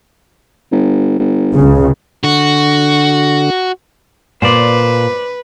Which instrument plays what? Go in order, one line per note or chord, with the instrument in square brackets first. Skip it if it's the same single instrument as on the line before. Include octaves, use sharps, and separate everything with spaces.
[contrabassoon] G1
G1
[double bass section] C#2 C#3
[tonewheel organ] D3 [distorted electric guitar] F#4
[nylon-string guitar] A#2 G#5 [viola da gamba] B4 [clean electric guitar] C5 D5